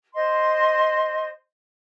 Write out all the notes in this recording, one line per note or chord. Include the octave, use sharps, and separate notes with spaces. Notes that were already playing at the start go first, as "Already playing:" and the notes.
C5 D#5 C6